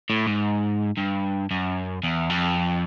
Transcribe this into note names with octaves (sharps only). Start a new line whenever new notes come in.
A2
G#2
G2
F#2
E2
F2